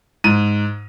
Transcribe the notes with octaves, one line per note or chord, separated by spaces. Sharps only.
G#2 D#7